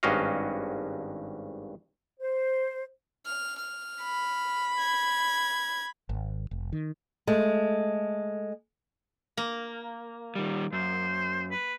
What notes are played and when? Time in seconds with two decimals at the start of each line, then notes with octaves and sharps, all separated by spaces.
0.03 G#1 G2 C#4 F#4 D#5 F5
2.20 C5
3.26 F6
3.58 F6
4.02 B5
4.78 G#6
6.09 G#1
6.51 F1
6.73 D#3
7.27 G#3 A3
9.37 A#3
10.36 D#3 G3
10.73 F#2 C5
11.51 B4